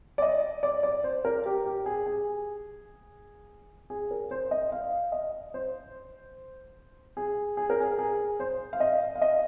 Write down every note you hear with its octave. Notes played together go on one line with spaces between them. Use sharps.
D5
D#5
D5
D5
C5
A#4
G4
G4
G#4
G#4
G#4
A#4
C5
D#5
F5
D#5
C5
G#4
G#4
A#4
G#4
G#4
C5
F5
D#5
F5
D#5